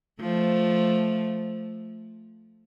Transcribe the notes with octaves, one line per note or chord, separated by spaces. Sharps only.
F3 A3